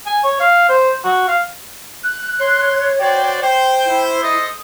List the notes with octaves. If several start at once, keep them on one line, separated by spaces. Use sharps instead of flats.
G#5
C#5
F5
C5
F#4
F5
F#6
C#5 C6
F#4 C5 D5 G5
C5 G5
E4
A4 C5 D#5 D#6